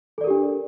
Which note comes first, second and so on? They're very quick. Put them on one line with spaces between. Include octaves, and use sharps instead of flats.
A4 D5 A#4 G4 D4